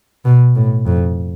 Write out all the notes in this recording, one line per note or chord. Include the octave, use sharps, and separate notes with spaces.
B2
A2
F2